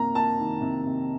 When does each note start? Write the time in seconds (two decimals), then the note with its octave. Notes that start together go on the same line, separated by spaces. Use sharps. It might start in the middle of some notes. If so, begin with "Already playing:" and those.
Already playing: C3 A#3 A#5
0.15 A#3 A5
0.38 D#3
0.61 C3
0.85 C3